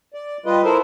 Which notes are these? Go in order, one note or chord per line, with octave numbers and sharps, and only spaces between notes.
D5
G3 F4 B4 D#5
E4 A4 A#4 C5